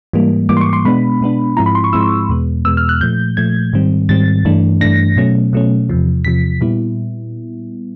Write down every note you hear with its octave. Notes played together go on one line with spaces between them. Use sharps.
G#2 E3 G3 A#3
G#2 E3 G3 A#3 D6
C6
C#6
C6
B2 G#3 B3 D4 B5
B2 G#3 B3 D4
G#2 F3 G#3 C4 E4 A#5
B5
C6
C#6
G#2 F3 G#3 C4 E4 E6
E2 B2 G#3 B3
E2 B2 G#3 B3 E6
F6
F#6
A#2 F3 A3 G6
A#2 F3 A3 G#6
G#2 D#3 G3 C4
G#2 D#3 G3 C4 A6
G2 E3 A3 D4
G2 E3 A3 D4 A#6
B2 F#3 A3 C#4
B2 F#3 A3 C#4
E2 C3 F3
E2 C3 F3 B6
A#2 G3 B3 E4